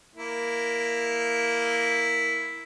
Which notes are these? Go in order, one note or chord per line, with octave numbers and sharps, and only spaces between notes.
A#3 E4